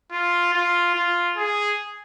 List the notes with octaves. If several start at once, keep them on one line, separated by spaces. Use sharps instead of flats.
F4
F4
F4
G#4